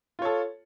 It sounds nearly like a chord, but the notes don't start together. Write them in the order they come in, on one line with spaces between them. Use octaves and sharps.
F4 C#5 A4